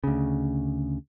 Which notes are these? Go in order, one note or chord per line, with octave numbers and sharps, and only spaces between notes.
D2 C#3